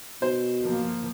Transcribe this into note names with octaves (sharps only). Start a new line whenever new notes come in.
B2 C5
F3 A#3